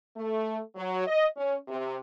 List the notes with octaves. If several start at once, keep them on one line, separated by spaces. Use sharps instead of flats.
A3
F#3
D#5
C#4
C3